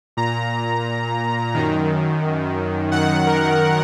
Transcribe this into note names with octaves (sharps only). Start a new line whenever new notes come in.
A#2 A#5
F#2 D#3
F#2 D#3 F#5
A#4